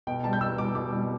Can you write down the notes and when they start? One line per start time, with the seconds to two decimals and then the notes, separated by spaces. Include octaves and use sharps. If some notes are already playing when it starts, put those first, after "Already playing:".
0.07 B2 G5
0.24 G3 A5
0.33 G6
0.41 B2 E6
0.58 G3 D6
0.75 B2 D6
0.93 G3